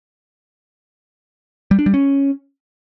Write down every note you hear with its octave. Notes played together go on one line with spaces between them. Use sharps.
G3
D4
G3
C#4